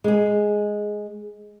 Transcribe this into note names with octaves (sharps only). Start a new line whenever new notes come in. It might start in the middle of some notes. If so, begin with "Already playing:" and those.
G#3 G#4